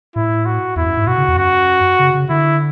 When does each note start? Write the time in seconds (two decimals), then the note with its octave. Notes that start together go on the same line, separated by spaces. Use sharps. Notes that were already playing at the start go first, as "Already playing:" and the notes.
0.15 A2 E4
0.46 F#4
0.76 E2 E4
0.86 F#2
0.97 G#2
1.07 B2 F#4
1.18 C#3
1.28 E2
1.37 F#2 F#4
1.99 C#3
2.14 C#3
2.30 D3 E4